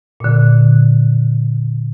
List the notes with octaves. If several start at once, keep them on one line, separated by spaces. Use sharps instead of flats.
A#2 D3